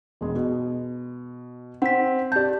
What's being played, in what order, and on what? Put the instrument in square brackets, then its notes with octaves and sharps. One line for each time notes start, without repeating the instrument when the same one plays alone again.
[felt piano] E1 G#3
B2
[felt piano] C4 [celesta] F#5 B6
[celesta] G4 G6 [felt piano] D5 A5